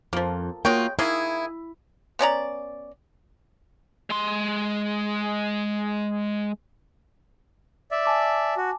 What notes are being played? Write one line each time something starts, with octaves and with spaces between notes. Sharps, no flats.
F2 F3 A#3
G#3 A#3 F4 F#4 C#5 G5
D#3 A#3 E4 G#4
B3 C#4 D5 A#5
G#3 C6
D5 E5
G#5 A5 D6
F#4